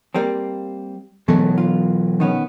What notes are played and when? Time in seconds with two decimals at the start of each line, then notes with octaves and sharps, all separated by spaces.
0.14 G3 A#3 C4
1.28 B2 E3 F#3 G#3 A3
1.58 F4
2.20 D#3 B3 C#4